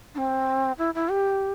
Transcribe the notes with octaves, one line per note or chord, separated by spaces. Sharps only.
D4
C4
E4
E4
G4